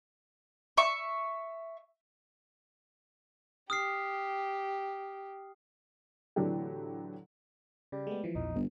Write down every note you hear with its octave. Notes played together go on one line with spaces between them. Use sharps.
E5 C#6
G4 D#6 F6 C7
A2 D3 E3 F#3 D4 G4
C#3 G3
G#3 A3 B3
E3 F3
A#1 E2 D#4
G1